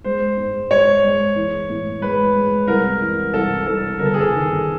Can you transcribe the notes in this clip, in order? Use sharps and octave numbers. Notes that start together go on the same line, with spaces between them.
G#3 C5
G#2
G#3 C#5
G#3
E3
A2
G#3 B4
G#3
C2 A#4
E3
C2 A4
C2 A4
G1 A#4
A4
G#4
A4
D#3